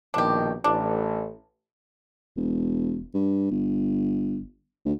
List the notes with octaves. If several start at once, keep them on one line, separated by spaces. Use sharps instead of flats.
A#1 B2 D#3 D4 G4
A1 D4
E1
G2
G1
D2